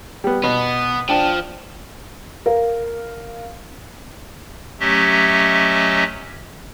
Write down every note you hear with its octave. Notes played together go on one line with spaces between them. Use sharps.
G3 B3
B2 B3
F3 D4 G5
A#4 F5
F#3 A3 C#4 G4 D#5 E5